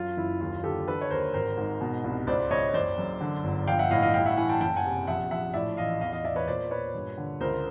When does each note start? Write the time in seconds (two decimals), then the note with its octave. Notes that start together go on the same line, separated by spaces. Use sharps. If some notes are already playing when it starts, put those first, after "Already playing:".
Already playing: F#2 F4
0.17 F#1 E4
0.41 D#2 F4
0.64 D3 G4 A4
0.87 D3 A4 B4
1.01 C#5
1.10 D#2 A#4 C5
1.34 G#1 A#4 C5
1.57 G#2
1.81 B2
2.04 C2
2.27 C#2 C5 D5
2.51 C#2 C#5 D#5
2.74 F#1 C5 D5
2.98 F#2
3.21 D3
3.44 G1
3.67 A#1 F5 G5
3.79 E5 F#5
3.91 A2 D#5 F5
4.02 D#5 F5
4.14 G2 F5 G5
4.26 E5 F#5
4.37 E3 F#5 G#5
4.49 G5 A5
4.61 F#1 G5 A5
4.76 F#5 G#5
4.85 C3
5.07 A#1 E5 F#5
5.31 A#1 E5 F#5
5.54 A2 D5 E5
5.77 A1 D#5 F5
6.01 E2 D#5 F5
6.12 D#5 F5
6.25 E1 D5 E5
6.36 B4 C#5
6.47 A#2 C5 D5
6.71 A#2 B4 C#5
6.94 G2
7.18 D3
7.41 C#2 A#4 C5